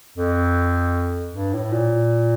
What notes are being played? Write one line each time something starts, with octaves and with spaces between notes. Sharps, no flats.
F2
G2
A2
A#2